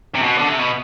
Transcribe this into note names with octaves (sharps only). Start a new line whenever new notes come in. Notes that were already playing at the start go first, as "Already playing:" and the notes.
C3
B2
D3
C3
B2